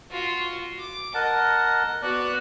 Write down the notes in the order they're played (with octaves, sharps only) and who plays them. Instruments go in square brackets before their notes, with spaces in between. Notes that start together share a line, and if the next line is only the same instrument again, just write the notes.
[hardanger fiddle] F4 F#4
D6
[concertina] A#4 F#5 A5 [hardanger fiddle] D#5
[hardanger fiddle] B3 F#4 [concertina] D5 F#6